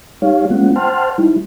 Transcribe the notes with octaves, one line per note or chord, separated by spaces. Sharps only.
G3 D#4 G4 C#5 F5
G#3 A#3 B3 C#4 F4 F#5
C5 F#5 G5 A5 C6 F6
G3 D#4 E4